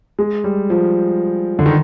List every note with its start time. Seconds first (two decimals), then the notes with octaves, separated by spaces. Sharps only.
0.19 G#3
0.44 G3
0.70 F3
1.59 D3
1.66 D#3